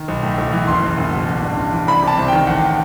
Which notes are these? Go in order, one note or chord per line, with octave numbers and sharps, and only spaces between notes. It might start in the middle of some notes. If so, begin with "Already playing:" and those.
Already playing: D#3
B1
A2
B1
E3
F#1 C6
E2
F#1
B2
A1
G2
A1
E3
C2 B5
C3
A5
C2
D#3 G5
A1 F#5